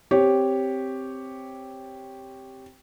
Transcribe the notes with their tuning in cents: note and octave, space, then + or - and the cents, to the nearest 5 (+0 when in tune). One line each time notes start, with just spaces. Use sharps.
C4 +0 G4 +0 C#5 +0